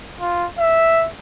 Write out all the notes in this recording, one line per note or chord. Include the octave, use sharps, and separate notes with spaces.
F4
E5